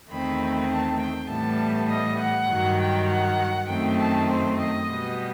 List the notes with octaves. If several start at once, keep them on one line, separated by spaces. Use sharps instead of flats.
E2 D#3 A3 C4 B5
A5
G5
A2 E3 G3 B3 A5
D#5
F#5
G2 D#3 F#3
G5
F#5
F#2 D#3 A3 C4 G5
A5
C5
D#5
B2 G3 B3